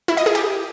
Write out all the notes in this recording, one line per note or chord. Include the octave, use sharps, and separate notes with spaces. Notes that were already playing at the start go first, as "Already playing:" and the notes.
E4
D#5
G#4
G4